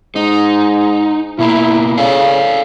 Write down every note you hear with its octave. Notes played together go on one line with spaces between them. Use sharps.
G#2 D#4
B2 A#3 E4
C#3 A4 D5 F5